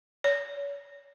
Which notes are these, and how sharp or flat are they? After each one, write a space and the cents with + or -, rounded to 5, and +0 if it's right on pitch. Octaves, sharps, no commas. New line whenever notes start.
C#5 +35